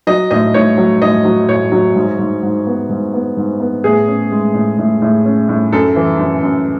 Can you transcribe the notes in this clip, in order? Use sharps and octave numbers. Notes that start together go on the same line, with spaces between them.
F#3 D#5
A2 D#5
A2 C#5
F#3
A2 D#5
F#3
A2 C#5
F#3
G#2
G#2
G#2
B3
G#2
B3
G#2
B3
A2 G#4
C#4
G#3
A2
A2
A2
C#4
A2
F#2 A4
E3
F#2
F#2